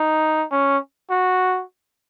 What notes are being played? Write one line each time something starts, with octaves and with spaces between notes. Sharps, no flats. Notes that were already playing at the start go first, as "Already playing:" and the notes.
Already playing: D#4
C#4
F#4